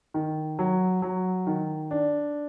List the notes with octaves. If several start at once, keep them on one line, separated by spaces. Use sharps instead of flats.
D#3
F#3
F#3
D#3
D4